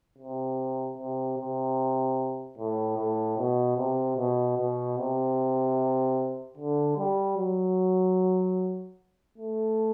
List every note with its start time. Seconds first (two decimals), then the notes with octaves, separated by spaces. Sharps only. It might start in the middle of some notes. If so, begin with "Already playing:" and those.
0.18 C3
0.98 C3
1.38 C3
2.58 A2
2.98 A2
3.38 B2
3.78 C3
4.18 B2
4.58 B2
4.98 C3
6.57 D3
6.97 G3
7.37 F#3
9.38 A3